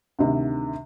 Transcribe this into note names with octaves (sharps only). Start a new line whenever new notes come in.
D2 C3 D#3